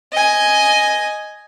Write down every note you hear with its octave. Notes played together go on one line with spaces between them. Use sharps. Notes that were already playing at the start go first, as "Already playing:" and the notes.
D#5 G#5